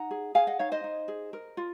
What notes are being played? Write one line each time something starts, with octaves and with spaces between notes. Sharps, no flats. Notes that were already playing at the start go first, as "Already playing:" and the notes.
Already playing: D#4 F#5 A#5
G#4
G#4 F5 G#5
D#5 F#5
D#4 C#5 F5
C5 D#5
D#4
G#4
A#4
F4